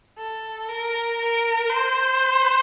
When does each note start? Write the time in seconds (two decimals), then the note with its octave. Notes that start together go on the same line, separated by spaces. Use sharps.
0.18 A4
0.69 A#4
1.19 A#4
1.69 C5